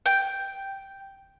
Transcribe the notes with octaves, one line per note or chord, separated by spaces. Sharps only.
G5